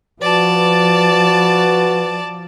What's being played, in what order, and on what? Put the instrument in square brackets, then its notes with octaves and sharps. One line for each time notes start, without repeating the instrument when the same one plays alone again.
[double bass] F3 [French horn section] F#4 B4 [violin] D5 A5